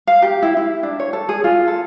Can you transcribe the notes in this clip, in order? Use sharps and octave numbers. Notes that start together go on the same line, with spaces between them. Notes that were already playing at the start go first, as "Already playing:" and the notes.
F5
G4
E4
E4
D4
C#5
A4
G#4
F4
A4